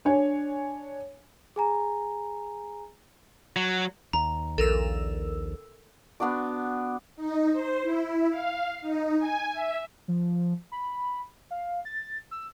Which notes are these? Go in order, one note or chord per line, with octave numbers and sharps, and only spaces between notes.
D4 C#5 G#5
G#4 G#5 A#5
F#3
D#2 A#5
A#1 A4 A#4 E6
B3 D4 F#4 D5
D#4
C5
E4
F5
D#4
G#5
E5
F3
B5
F5
A6
E6